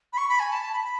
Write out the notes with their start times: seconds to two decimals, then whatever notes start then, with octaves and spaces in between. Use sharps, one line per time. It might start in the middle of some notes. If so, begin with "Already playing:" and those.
0.13 B5
0.18 C#6
0.29 B5
0.40 G#5
0.51 A5
0.62 A5
0.73 B5
0.84 B5